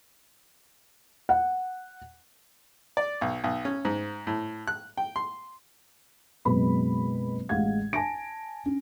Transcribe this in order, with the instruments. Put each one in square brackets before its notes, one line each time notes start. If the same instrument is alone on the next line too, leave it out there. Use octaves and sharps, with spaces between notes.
[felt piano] F#5
[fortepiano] D5
B1
B1
C#4
G#2
A2
F#6
G5
C6
[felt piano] F#1 B2 G#3 C4 B4 B5
A1 G#3 F5 F#5 G#6
G#5 A5 A#6 D7
C#4